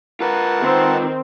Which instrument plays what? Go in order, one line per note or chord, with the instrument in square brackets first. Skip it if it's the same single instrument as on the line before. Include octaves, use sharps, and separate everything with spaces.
[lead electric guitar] F4 B4 [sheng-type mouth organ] A#4 F#5 A5
[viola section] D#3 C4